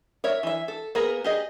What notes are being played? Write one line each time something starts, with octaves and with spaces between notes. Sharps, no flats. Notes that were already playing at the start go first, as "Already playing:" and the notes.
A#4 C#5 E5
E3 E5
A4
A#3 B3 G#4 A#4 B4
G4 G#4 D#5